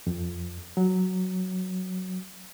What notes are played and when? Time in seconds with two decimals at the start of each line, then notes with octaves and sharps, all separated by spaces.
0.07 F2
0.77 F#3